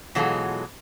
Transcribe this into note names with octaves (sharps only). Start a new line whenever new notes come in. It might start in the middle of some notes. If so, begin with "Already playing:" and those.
B2 E3 F#3 G#3 F4 A4